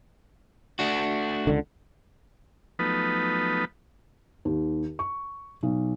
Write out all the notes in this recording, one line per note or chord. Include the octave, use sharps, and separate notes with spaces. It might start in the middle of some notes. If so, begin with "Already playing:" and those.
A3 D4 F#4
C#2 D3
F3 F#3 A3 B3 D#4 B4
D#2
C#6
B1